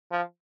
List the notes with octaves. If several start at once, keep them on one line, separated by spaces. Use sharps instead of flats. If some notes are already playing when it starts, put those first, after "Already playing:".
F3